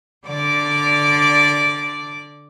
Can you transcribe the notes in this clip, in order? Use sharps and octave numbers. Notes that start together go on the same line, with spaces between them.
D3 D5 D6